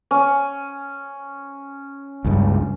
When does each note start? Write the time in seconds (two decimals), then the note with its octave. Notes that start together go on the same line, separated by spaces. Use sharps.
0.11 C#4
2.24 C#2 G2